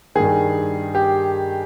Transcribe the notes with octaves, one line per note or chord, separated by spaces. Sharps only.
G2 D#3 G#4
G4